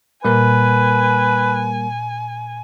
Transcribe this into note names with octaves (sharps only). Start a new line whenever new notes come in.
A#2 G3 A#3 A#4 B4 G#5